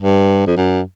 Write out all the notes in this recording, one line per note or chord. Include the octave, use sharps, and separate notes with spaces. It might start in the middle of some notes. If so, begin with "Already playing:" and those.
G2
F2
F#2